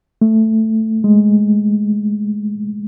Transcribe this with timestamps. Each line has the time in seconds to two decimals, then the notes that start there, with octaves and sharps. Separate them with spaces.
0.21 A3
1.04 G#3